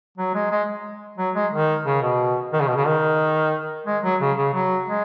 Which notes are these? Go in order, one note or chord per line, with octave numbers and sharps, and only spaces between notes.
F#3
G#3
G#3
F#3
G#3
D#3
C#3
B2
D#3
C#3
B2
C#3
D#3
G#3
F#3
C#3
C#3
F#3
G#3